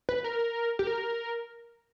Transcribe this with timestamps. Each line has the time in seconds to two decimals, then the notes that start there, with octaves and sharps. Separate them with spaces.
0.09 B4
0.24 A#4
0.79 G4
0.87 A#4